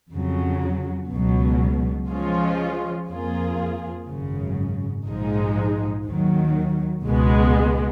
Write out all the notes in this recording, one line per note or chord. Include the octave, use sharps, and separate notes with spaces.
F2 C#3 F#3
C#2 B2 F#3
F3 G#3 C#4 F4
F2 F3 A#3 F4 G#4
G#1 F#2 C#3
A#1 G#2 F3 G#3 D#4
D#2 D#3 F#3
C#2 B2 G#3 B3